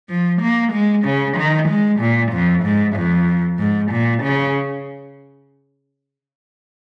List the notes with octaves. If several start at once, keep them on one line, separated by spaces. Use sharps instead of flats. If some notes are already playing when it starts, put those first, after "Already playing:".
F3
A#3
G#3
C#3
D#3
G#3
A#2
F2
G#2
F2
G#2
A#2
C#3